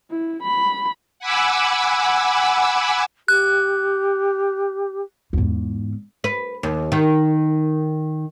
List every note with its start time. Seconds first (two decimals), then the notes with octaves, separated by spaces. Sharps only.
0.11 E4
0.43 B5
1.19 F#5 G#5 B5 D6 E6
3.28 G4 F#6
5.33 E2 G#2
6.24 B4
6.63 D#2
6.92 D#3